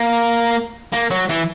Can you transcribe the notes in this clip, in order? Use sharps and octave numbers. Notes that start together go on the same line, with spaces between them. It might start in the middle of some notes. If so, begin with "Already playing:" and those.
Already playing: A#3
A#3
F#3
E3